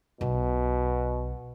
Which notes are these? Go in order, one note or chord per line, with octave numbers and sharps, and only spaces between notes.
B1 B2